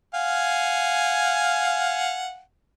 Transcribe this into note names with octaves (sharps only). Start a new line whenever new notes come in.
F5 F#5 G#5